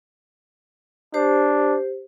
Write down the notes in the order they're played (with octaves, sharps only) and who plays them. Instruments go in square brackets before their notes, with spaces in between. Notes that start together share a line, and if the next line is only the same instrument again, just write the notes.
[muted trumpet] D4 [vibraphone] G4 C5